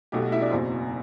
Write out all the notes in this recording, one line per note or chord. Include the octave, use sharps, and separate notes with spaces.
B1 B2 A3 G4
F#4
E4 E5
D4 D5
F#1 E2 B2 C4 C5